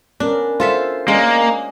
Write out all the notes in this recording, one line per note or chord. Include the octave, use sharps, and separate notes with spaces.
B3 C#4 D4 A#4
F4 F#4 A4 C5 E5
G#3 A#3 C#4 D5 D#5